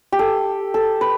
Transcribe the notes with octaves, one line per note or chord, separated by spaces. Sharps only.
G4
A4
A4
B4